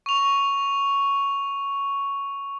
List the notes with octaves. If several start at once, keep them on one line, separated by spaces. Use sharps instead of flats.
C#6 F7